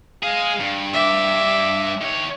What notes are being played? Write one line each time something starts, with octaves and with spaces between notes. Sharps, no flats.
G#3 G#4 F5
G2
E5 D6
D#3 C#5